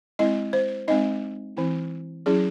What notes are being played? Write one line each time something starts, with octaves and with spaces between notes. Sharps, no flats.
G#3 C4 E4 D#5
C5
G#3 C4 D#4 D#5
E3 C4 E4
F#3 C#4 E4 G#4